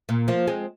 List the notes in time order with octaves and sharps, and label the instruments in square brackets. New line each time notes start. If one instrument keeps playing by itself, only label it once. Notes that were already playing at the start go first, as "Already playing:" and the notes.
[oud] A#2
F3 A#3
G#3 C4